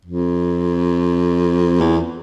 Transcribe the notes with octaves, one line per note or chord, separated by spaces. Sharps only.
F2
E2